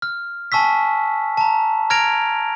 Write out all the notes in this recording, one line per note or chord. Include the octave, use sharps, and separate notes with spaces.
F6
G#5 A5 C#6 E6 B6
A5 A#5
A#5 F6 G#6 A#6 D7 F7